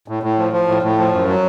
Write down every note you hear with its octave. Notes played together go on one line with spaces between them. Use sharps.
A2
A2
F3
F3
A2
A2
F3
F#2
F#3